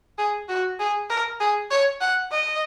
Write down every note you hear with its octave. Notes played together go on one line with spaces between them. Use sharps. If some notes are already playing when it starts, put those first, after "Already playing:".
G#4
F#4
G#4
A#4
G#4
C#5
F#5
D#5